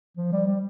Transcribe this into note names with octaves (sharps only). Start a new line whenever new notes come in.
F3
G3
G3